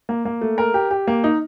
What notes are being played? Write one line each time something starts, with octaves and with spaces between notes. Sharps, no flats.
A#3
A#3
A3
A#4
G4
G4
A#3
D#4